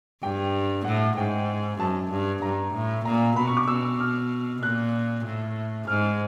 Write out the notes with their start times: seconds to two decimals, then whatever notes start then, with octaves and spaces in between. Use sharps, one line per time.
0.22 G2 G5
0.84 A2 F#5
1.17 G#2 G5
1.79 F#2 A5
2.11 G2
2.42 G2 A#5
2.73 A2
3.05 A#2 A#5
3.36 B2 B5
3.47 C#6
3.57 D6
3.67 B2 E6
4.00 F6
4.62 A#2 F#6
5.25 A2
5.87 G#2 F6